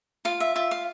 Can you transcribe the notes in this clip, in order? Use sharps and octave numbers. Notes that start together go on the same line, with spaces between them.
F4 F5
E5
F4 E5
F5